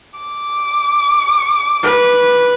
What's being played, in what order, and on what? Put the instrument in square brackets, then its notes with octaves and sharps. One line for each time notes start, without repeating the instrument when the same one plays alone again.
[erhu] D6
[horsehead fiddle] B4